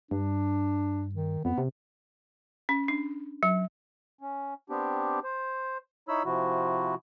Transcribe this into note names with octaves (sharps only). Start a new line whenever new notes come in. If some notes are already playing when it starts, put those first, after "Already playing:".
G2 D4
D#3
F2 B3
C3
C#4
D4
F#3
C#4
B3 C4 D4 G4
C5
D#4 E4 C#5 B5 E6
C3 F3 E4 F#4